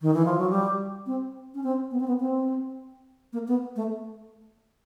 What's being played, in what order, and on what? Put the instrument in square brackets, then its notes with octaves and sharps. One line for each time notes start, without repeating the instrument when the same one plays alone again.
[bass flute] D#3
E3
F3
F#3
G3
C4
C#4
C4
B3
C4
B3
C4
A#3
B3
A3